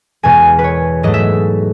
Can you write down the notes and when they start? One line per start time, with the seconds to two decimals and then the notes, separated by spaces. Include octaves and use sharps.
0.23 E2 B2 G#3 G#5
0.59 B4
0.64 C#5
1.03 G#2 F#3 A3 D#5
1.14 E5